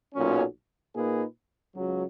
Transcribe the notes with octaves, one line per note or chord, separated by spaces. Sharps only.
B1 A#2 F#3 C#4
A#2 A#3 D#4 G#4 B4
C#2 C#3 F#3